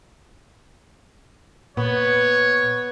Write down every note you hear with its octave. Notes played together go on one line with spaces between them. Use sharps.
A#2 B3 C#5